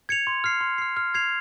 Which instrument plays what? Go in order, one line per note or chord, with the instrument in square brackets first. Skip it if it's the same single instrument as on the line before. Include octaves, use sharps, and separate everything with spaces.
[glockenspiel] G#6 C#7 F7
C6
F6 C7
C6
F6 C7
F6
G#6 C7 F7